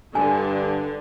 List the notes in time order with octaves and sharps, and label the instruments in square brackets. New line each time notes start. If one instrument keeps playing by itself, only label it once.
[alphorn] G2 [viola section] D3 [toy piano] G#5